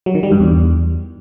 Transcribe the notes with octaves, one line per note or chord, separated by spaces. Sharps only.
F#3
D#3
G3
G2
E2